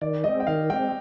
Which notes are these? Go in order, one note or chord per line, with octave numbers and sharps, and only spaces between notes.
D#3 D5
G#3 C4 D#5
G5
D#3 F5
G#3 C4 G5